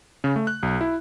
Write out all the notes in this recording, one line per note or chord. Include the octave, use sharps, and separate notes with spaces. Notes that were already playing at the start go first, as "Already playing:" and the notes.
C#3
A3
F#6
B1
E4